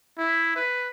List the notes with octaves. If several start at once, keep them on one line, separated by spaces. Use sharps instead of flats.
E4
B4